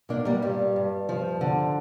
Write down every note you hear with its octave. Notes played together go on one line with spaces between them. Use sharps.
A#2 A#3 D4
G3 A#3
G2 G3
G2
F3
D3